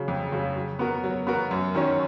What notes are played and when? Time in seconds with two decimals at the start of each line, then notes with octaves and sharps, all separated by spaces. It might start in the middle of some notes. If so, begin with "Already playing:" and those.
Already playing: C#3 F#3
0.08 F2
0.32 C#3 F#3
0.56 F#3
0.79 B3 F#4 A#4
1.04 F#3
1.27 B3 F#4 A#4
1.51 F#2
1.75 D#3 F#3 C#4